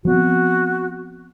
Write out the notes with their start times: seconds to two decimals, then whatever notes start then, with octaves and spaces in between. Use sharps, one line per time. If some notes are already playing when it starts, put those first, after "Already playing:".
0.05 F3 B3 C4 F#4